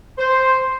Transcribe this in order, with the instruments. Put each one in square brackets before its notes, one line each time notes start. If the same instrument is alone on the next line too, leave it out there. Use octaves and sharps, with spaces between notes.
[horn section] C5